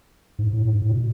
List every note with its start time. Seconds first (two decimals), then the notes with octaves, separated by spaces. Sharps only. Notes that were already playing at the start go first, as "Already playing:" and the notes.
0.39 G#2
0.53 A2
0.67 G#2
0.82 A2
0.92 B2